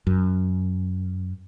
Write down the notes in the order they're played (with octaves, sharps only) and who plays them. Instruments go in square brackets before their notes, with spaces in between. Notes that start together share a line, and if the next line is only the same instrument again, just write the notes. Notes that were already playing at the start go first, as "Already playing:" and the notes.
[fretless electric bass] F#2